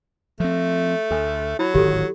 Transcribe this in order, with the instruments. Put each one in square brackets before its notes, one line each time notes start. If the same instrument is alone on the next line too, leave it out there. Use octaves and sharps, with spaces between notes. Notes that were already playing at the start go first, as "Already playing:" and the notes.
[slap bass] F3 C4 [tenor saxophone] A3
[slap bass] D2 [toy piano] A4 G#5
[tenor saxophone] F#3 [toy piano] E4 B5
[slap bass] D1 G#1 D#3 [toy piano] G4 A4